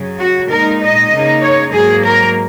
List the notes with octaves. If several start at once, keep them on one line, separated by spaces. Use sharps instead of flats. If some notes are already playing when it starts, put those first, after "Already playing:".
Already playing: F#2 C#3 F#3
F#4
A#2 G#3 D#4 A#4
D#5
C#3 A#3 D#4
C#5
G#2 F#3 A#3 G#4
A#4